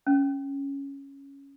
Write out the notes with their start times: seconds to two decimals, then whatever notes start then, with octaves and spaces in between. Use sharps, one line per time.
0.07 C#4